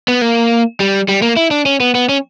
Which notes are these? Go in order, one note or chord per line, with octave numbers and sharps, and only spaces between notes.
B3
A#3
G3
G3
A#3
E4
D4
C#4
B3
B3
C#4